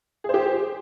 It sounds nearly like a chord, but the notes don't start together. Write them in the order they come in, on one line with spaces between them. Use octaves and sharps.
G#4 C5 G4